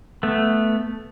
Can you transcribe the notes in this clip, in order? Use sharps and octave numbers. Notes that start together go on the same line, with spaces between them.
A3 B3